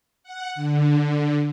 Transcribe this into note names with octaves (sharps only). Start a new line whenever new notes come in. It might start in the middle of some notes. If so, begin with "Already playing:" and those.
F#5
D3